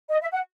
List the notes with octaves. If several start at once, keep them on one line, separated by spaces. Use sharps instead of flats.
D#5
E5
F#5